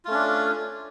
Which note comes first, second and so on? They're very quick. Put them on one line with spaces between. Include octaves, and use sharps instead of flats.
F4 A3 C#4 D4